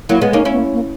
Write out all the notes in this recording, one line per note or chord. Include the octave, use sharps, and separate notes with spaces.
F#3 A#3 E4
G#3 B3
A#3 C#4 D#4
C#4 E4
B3
A#3
A#3